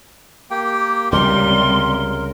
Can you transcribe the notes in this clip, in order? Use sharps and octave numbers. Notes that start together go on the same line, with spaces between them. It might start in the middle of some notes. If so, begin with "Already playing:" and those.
A#3 G4 G5
C#2 C3 G3 A#4 C6